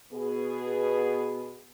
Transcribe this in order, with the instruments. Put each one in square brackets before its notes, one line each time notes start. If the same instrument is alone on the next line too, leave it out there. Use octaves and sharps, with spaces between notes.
[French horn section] B2 B3 G#4